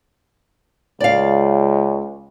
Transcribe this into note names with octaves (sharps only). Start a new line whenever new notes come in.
C#2 D5 F5